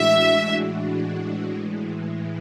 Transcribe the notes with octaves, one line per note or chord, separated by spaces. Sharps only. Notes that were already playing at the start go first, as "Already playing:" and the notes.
Already playing: A2 E3 G#3 D4 F#4 E5
A2 E3 G#3